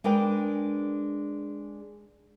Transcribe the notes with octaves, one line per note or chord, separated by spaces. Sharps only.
G#3 D4 A#4 B4 G5